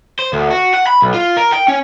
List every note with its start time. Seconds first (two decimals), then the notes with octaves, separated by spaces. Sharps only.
0.19 C5
0.33 D2
0.51 F#4
0.74 F#5
0.87 B5
1.02 B1
1.14 F4
1.37 A#4
1.52 G5
1.68 C#4